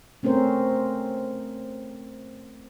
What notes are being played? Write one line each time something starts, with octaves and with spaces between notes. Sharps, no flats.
A3 C4 C#4 A#4 C5